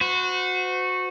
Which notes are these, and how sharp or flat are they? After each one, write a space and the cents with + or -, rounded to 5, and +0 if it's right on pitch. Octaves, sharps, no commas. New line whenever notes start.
F#4 -15 C5 -40